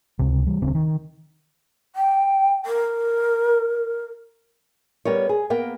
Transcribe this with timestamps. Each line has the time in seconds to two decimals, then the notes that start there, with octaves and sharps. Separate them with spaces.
0.19 C#2 C3
0.47 E3 G3
0.61 D1 C#3 C4 D4
0.75 D#3
1.96 G5
2.66 A#4
5.05 G3 B3 A#4 C#5
5.29 G#4
5.50 A#3 B3 A#4 G5